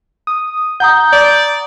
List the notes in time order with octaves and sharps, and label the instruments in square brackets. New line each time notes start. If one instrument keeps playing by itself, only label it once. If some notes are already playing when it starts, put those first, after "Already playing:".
[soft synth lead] D#6
[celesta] F#5 A#5 D#6 [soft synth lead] G6
[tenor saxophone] D5